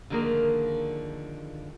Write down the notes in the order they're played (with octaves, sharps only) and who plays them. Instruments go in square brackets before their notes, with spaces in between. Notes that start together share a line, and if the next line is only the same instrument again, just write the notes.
[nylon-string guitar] D3 D#3 F3 A#3 G#4 A#4